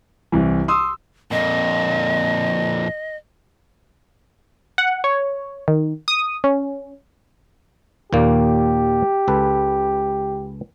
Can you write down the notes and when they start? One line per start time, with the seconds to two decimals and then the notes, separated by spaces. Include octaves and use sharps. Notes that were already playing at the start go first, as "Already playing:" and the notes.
0.32 C2 E3
0.68 C6 D#6 E6
1.31 F2 A#2 D#5
4.78 F#5
5.04 C#5
5.68 D#3
6.08 D#6
6.44 C#4
8.13 D#2 A#2 A#3 G4
9.28 C#2 A4 B4